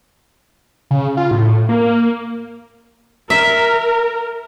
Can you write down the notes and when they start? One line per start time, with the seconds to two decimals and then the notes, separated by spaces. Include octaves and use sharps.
0.91 C#3
1.17 F4
1.31 A2
1.69 A#3
3.30 A#4 E5